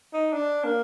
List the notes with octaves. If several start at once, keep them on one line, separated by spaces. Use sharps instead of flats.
D#4
D4
A#3